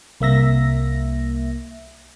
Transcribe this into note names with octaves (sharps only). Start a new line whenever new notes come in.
C2 A#3 E5 A#6